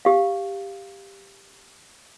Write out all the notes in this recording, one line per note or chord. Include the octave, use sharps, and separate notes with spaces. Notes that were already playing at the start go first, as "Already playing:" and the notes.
G4 F5